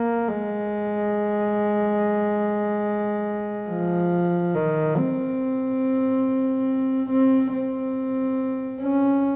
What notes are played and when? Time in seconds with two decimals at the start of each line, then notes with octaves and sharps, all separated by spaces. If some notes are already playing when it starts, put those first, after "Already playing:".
Already playing: A#3
0.29 G#3
3.69 F3
4.55 D#3
4.97 C4
7.10 C4
7.53 C4
8.81 C#4